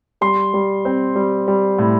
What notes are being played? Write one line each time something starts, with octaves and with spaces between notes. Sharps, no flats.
G3 C6
G3
C4
G3
G3
A2